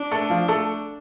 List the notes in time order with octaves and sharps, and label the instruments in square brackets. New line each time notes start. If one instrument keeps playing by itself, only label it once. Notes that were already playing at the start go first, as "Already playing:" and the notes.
Already playing: [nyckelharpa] D4
[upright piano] A3 A4
F3 F4
A3 A4